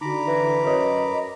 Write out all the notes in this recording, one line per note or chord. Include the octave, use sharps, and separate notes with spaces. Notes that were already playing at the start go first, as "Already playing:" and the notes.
D3 D#4 F#4 A#5 B5 D6
E3
F#2 B4 C#5 D#5 D#6